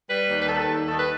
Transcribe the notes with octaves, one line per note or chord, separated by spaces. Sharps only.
G3 B4
D#2
B4
D#3 A4
D#2
D#3 A4
B4